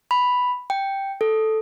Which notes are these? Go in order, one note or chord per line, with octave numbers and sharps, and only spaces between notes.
B5
G5
A4